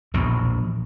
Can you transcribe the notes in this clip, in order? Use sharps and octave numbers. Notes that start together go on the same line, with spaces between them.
A#1 E2 B2